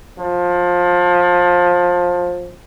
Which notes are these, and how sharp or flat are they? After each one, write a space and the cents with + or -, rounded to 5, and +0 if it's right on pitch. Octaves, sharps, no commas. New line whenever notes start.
F3 +20